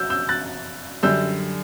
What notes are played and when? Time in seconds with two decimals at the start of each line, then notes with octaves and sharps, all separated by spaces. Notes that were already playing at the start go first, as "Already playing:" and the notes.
Already playing: B2 F#3 E6 G6
0.10 E6 G6
0.29 F#6 A6
1.03 F#2 D3 G3 E6 G6